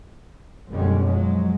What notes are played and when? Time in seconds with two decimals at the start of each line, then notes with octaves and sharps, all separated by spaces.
0.69 F#1 B2 D3 G3 G#3 C#4
1.03 F3 F#3 G#3